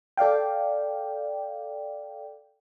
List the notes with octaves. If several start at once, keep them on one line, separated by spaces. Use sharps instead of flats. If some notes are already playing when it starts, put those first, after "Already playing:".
A4 D5 F5 G5